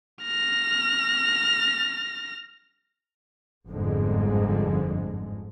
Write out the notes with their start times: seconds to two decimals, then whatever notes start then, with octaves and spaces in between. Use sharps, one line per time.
0.23 F6 A#6
3.67 G1 F2 G#2 D3 G#3